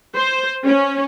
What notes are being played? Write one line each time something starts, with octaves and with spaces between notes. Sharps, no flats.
C5
C#4